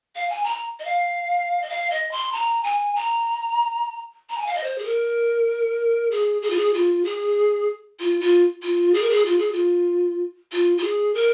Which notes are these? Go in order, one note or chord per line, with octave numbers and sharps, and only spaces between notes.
F5
G#5
A#5
D#5
F5
D#5
F5
D#5
C6
A#5
G#5
A#5
A#5
G#5
F5
D#5
C5
G#4
A#4
G#4
G#4
F4
G#4
F4
G#4
F4
F4
F4
G#4
A#4
G#4
F4
G#4
F4
F4
F4
G#4
A#4